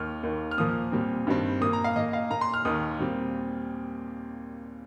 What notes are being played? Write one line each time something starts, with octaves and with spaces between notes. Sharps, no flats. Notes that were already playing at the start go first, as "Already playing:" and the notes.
Already playing: D#2 D#3 F6
D#2 D#3 A#3
F6
A#2 F3 A#3 D#6
A#2 G3 C4
G2 D#3 G3 C4
A#2 A#3 D#6
A#5
F5
A#2 A#3 D#5
F5
A#2 A#3 A#5
C6
F6
D#2 D#3 A#3 D#6
A#2 G3 C4